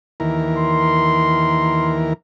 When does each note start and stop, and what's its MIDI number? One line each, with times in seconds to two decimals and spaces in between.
0.20 2.13 39
0.20 2.13 52
0.20 2.13 70
0.58 1.98 84